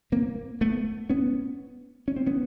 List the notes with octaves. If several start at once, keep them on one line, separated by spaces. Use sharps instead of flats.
A#3 C4
A3 B3
B3 C#4
C#4
C4
B3 C#4